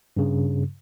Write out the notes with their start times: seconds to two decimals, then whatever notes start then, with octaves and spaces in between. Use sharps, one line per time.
0.17 G2 C#3